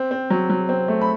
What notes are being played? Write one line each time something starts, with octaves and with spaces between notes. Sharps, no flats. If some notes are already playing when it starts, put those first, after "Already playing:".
Already playing: C4
C4
F#3
F#3
C4
A3
B5